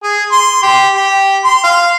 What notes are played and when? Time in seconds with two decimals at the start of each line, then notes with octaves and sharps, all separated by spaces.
0.03 G#4
0.32 C6
0.63 G4
0.95 G4
1.44 C6
1.64 F5